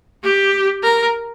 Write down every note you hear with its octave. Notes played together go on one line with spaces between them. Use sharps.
G4
A#4